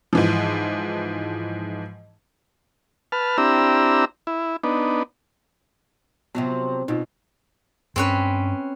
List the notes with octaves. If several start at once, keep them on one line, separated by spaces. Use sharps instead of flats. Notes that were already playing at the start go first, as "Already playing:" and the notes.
G#2 E3 F3
B4 A5 F6
C4 D4 E4 G4 A#5 E6
E4
B3 D4 D#4
C3 F3 F#3 B3
B2 D#4 F4
G2 G#3 C4 C#4 B4